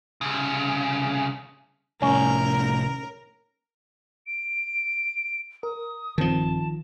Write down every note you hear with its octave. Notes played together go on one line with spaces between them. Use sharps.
C2 C#3
C2 A2 C#4 A#4
D7
A#4 D#6
A#1 G2 D#3 F3 C4 A5